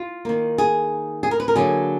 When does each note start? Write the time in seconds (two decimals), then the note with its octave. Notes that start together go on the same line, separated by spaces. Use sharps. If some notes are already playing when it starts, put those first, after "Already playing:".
Already playing: F4
0.25 D#3 A#3
0.58 G#4
1.23 G#4
1.31 A#4
1.40 B4
1.48 A#4
1.56 D3 F#3 A#3 G#4